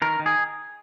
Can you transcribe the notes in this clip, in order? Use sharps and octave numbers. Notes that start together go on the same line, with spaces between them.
D#3 A#4
D#3
G#4